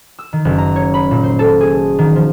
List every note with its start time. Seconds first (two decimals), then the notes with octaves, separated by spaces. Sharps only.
0.19 E6
0.33 D#3
0.45 F#1
0.58 A#5
0.76 C#5
0.94 B5
1.11 A#2
1.23 C5
1.39 A4
1.61 G#4
1.98 D#3
2.16 F3